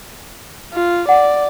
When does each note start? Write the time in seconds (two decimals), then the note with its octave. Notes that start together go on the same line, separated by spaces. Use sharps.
0.74 F4
1.09 D5 F#5